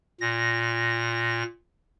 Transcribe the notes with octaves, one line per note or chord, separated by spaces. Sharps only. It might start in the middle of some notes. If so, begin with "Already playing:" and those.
A#2 A#6